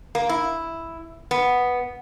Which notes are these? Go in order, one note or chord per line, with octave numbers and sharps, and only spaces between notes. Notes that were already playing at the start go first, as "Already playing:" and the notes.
A#3
E4
B3